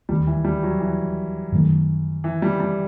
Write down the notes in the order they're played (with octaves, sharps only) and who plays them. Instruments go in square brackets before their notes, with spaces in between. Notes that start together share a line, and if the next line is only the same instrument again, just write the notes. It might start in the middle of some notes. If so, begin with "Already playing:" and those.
[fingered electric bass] E1 D#2 D#3 A3 [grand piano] G3
[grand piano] E3
G3
F#3
E3
[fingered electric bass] F#2 D#3 A3
[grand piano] E3
G3
G3